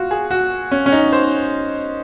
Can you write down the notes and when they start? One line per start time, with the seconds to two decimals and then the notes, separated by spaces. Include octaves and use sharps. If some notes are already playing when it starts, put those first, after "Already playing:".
Already playing: F4 F#4
0.11 G#4
0.31 F#4
0.71 C#4
0.86 C#4
0.92 D#4
1.13 C5